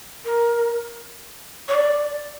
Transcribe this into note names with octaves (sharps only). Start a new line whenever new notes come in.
A#4
C#5
D5